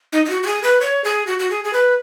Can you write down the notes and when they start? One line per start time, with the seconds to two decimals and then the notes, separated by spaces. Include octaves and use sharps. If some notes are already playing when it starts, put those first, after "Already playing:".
0.13 D#4
0.25 D#4
0.30 F#4
0.43 F#4
0.47 G#4
0.63 B4
0.81 C#5
1.04 G#4
1.27 F#4
1.39 F#4
1.50 G#4
1.64 G#4
1.73 B4